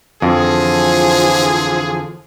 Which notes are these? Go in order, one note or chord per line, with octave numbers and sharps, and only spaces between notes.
F2 D3 E3 F3 G#4